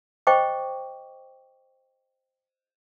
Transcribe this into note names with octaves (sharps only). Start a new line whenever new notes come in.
C5 D#5 G5 C#6 D6